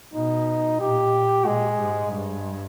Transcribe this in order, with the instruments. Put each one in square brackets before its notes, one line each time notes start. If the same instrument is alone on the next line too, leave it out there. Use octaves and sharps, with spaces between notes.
[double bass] B2 [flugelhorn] D#4
[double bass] A#2 [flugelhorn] G4
[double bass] A#2 [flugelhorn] G#3
[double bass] G#2
[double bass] G2 [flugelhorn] G#3